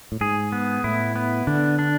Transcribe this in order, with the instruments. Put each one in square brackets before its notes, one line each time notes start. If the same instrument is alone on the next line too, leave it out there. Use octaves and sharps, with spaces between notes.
[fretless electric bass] A2
[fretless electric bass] G#2 [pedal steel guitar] G#4
[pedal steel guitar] B3
[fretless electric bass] A2 [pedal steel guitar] E4
[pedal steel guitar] B3
[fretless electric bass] D3 [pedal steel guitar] D4
[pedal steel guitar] D4